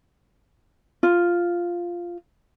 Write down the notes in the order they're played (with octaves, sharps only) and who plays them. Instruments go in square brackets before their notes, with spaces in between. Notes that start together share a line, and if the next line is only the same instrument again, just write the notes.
[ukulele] F4